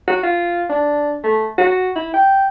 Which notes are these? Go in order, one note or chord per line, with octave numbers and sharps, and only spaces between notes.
F#4
F4
D4
A3
F#4
E4
G5